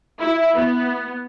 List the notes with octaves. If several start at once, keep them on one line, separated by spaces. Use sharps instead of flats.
E4
B3